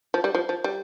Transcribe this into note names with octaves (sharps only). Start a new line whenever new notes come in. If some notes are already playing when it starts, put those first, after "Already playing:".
F3
G3
F3
F3
G3